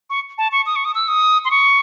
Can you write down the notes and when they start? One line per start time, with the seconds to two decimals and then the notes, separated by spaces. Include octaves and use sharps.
0.10 C#6
0.38 A5
0.52 C#6
0.66 D#6
0.76 C#6
0.85 D#6
0.95 E6
1.08 D#6
1.45 C6
1.51 C#6